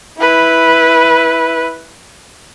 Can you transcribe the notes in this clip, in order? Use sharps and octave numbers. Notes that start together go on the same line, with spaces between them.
E4 B4